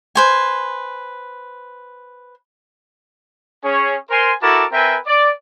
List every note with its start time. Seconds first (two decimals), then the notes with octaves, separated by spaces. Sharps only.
0.15 B4 C5 G#5
3.63 C#4 G#4 C#5
4.10 A#4 C5 G#5 C6
4.42 E4 F#4 A4 A#4 A5 D6
4.72 C4 A#4 B4 E5 G5 G#5
5.07 D5 D6